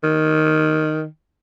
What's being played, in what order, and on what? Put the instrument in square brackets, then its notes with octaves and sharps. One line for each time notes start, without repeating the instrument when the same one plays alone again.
[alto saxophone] D#3